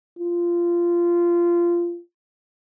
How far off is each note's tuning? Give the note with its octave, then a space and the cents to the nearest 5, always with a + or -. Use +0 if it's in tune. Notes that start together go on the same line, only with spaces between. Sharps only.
F4 -15